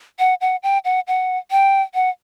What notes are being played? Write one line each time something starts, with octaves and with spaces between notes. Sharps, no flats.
F#5
F#5
G5
F#5
F#5
G5
F#5